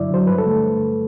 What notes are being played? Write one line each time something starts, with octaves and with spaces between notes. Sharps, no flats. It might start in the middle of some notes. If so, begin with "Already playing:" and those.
Already playing: G2 D3 F#3 E4 D5 E5
D3 F#3 C5
G2 B4
A4
D3 A3